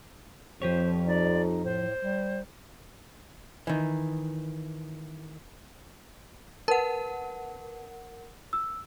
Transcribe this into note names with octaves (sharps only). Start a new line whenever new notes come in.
F2 F3 G4 C5 C#5
D#4 D5
A2 C5
G3
D#3 E3
A#4 B4 F#5 A5
E6